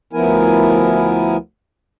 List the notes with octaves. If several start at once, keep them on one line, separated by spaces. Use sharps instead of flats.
D2 F3 B3 E4 A#4 G#5